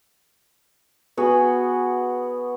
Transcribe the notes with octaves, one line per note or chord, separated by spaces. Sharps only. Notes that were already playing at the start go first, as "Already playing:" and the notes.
B3 F#4 G#4